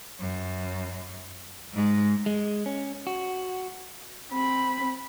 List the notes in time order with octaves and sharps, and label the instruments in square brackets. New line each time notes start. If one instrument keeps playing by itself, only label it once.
[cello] F#2
G#2 G#3
[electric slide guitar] G#3
C#4
F#4
[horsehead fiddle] C4 B5